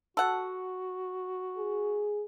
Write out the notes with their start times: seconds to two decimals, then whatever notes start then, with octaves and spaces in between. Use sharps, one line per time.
0.17 F#4 A4 F#5
1.57 G#4